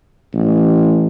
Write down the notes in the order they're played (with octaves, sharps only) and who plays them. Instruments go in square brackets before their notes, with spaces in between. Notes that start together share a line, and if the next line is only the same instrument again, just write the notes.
[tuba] A1